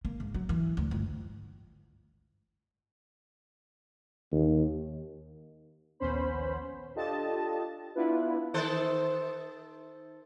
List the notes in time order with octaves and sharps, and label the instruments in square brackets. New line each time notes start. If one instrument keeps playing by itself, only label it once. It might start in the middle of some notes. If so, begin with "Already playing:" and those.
[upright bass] A#3
G#2
F#3
E3
D2
G1
[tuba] D#2
[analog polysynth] A#1 D#2 B3 C#4 C5 B5
D4 F4 G4 A4 D#5 A5
B3 D4 E4 F4 B4
[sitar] D#3 A4 C5